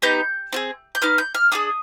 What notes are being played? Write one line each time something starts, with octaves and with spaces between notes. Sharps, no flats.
B3 D#4 G4 G6
C4 F4 G#4
G6
B3 D#4 F6
G6
F6
D4 F4 G#4 D#6